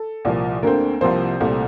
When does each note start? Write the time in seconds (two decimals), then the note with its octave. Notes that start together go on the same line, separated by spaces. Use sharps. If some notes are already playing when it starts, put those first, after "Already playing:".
Already playing: A4
0.25 C2 A#2 F3 A#3
0.63 D2 D3 A3 A#3 C4 A#4
1.01 C2 C3 F3 A#3 C4 C5
1.40 C2 A#2 A3